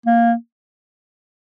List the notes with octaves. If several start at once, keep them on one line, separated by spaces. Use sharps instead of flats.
A#3